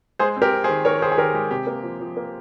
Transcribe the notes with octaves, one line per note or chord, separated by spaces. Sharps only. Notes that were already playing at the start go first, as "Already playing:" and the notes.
G#3 G#4 C5
C4
G4 A#4
C4
G#4 C5
D#3
D#3 A#4 C#5
D#3 G#4 C5
G#4
D#3 G4 A#4
G#3 G4
C3 G4
A#3
F3
F3
A#3